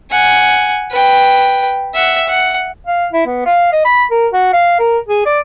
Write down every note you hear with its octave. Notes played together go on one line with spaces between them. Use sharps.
F#5 G#5
B4 G5
E5 F#5
F#5
F5
E4
B3
F5
D#5
B5
A#4
F#4
F5
A#4
G#4
D5